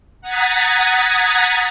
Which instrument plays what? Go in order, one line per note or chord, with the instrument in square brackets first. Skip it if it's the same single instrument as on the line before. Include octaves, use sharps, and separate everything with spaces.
[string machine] F#5 A#5 D#6 G#6 A6 B6